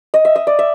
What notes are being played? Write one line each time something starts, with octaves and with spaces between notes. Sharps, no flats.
D#5
E5
D#5
D5
E5